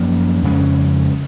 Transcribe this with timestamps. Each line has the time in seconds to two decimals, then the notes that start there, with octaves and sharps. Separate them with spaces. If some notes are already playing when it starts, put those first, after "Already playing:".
Already playing: F#2 F3 A#3 C#4
0.43 F2 C#3 G#3 C#4